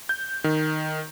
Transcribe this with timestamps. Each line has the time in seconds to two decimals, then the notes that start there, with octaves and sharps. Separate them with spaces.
0.09 G6
0.44 D#3